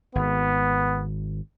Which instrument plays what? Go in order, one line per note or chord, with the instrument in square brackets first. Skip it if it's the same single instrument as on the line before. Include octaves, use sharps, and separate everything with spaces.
[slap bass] G#1 [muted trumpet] B3